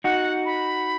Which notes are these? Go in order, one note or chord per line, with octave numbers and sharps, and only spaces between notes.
D#4 F#4 F#5
B5